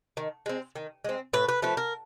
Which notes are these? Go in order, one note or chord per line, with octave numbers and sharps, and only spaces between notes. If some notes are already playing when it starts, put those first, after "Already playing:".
D#3
G#3 C4
D#3
G#3 C4
A2 B4
B4
F3 A3 B4
A#4